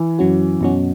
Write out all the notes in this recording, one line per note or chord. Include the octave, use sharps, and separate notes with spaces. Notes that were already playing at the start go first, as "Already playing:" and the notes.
Already playing: E3
F#2 F#3 C#4 F#4
F#2 B2 F#3 C#4 F#4